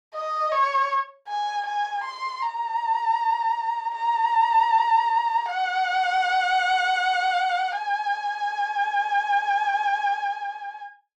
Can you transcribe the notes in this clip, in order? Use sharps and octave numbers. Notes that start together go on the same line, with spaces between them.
D#5
C#5
G#5
G#5
C6
A#5
A#5
F#5
G#5